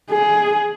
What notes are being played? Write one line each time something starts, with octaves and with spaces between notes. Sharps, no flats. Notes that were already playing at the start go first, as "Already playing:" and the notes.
G#4